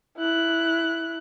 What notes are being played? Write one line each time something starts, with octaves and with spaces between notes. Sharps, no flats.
E4 F#6